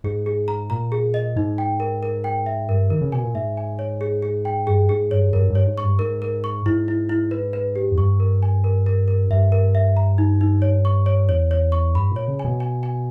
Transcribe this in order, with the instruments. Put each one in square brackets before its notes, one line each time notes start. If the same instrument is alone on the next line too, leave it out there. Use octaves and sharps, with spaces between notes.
[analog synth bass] G#2 [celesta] G#4
[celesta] G#4
A#5
[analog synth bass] A#2 [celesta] A#5
[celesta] G#4
D#5
[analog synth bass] G#2 [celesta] D#4
[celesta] G5
A#4
A#4
G5
E5
[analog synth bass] G2 [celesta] A#4
[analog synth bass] D#3 [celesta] A#4
[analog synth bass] C#3
[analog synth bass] B2 [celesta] G#5
[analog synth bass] A#2
[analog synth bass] G#2 [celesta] E5
[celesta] G#5
C#5
G#4
G#4
G5
[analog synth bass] G2 [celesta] G#4
[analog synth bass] G#2 [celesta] G#4
[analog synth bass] G2 [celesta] C#5
[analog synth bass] G2 [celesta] A#4
[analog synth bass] G2
[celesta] C#5
[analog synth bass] G#2
[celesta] C#6
[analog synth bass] G2
[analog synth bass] G#2 [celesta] A#4
[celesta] A#4
C#6
[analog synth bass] G#2 [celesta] E4
[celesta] E4
E4
B4
B4
G4
[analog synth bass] E2
[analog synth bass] G2 [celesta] C#6
[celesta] A#4
G#5
A#4
A#4
A#4
[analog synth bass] G2 [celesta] E5
[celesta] A#4
E5
A#5
D#4
D#4
C#5
C#6
C#5
[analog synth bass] E2 [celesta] C#5
[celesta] C#5
C#6
[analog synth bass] G2 [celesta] B5
[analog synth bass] A#2
[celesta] C#5
[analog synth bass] C#3
[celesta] G#5
[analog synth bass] B2
[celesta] G#5
G#5